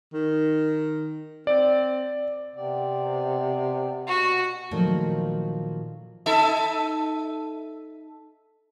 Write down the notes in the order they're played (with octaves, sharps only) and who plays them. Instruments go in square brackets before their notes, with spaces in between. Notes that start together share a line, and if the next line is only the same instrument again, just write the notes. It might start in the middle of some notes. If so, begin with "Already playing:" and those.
[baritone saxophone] D#3
[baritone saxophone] C4 [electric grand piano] D5
[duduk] C3 [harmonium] B3 C4 D5
[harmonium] B2 [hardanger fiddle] F#4
[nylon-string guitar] A#2 D#3 F3 F#3 A3
[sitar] D#4 A4 E5